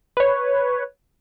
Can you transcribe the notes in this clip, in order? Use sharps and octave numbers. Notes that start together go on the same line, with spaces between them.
B4 C#5